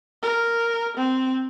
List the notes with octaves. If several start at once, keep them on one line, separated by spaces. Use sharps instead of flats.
A#4
C4